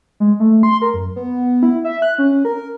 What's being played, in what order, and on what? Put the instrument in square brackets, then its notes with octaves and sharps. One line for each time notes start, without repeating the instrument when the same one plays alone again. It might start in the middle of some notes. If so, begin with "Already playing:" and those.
[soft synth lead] G#3
A3
C6
A#4
F#2
B3
E4
E5
F#6
C#4
A#4